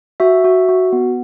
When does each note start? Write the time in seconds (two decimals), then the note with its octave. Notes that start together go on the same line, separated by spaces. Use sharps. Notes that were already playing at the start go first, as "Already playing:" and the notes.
0.20 F#4 E5
0.44 F#4
0.69 F#4
0.92 B3